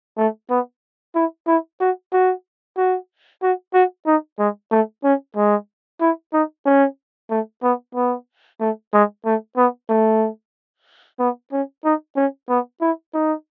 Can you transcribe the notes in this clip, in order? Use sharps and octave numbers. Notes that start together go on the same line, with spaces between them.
A3
B3
E4
E4
F#4
F#4
F#4
F#4
F#4
D#4
G#3
A3
C#4
G#3
E4
D#4
C#4
A3
B3
B3
A3
G#3
A3
B3
A3
B3
C#4
D#4
C#4
B3
E4
D#4